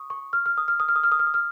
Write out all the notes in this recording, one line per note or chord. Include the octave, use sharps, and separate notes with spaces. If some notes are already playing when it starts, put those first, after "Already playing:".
Already playing: C#6 D#6
C#6
F6
F6
D#6
F6
D#6
F6
D#6
F6
D#6
F6
D#6
F6